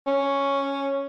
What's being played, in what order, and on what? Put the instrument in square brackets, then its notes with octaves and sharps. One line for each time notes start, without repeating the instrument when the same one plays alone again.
[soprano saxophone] C#4